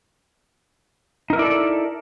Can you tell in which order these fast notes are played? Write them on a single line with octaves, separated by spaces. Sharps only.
D#4 A#4 E4 D5 A4